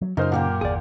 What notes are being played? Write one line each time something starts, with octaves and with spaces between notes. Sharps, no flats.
F#3
F#2 C#3 D#4 F4 A#4 C5 F5
A#2 A#3 G4 A#4 F#5
G1 E2 G#4 D5